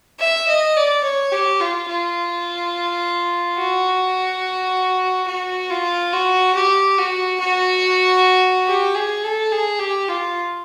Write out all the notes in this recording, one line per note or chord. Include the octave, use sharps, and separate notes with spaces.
E5
D#5
D5
C#5
G4
F4
F4
F#4
F#4
F4
F#4
G4
F#4
F#4
G4
G#4
A4
G#4
G4
F4